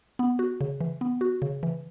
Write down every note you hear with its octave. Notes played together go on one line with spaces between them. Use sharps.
B3
F#4
C#3
E3
B3
F#4
C#3
E3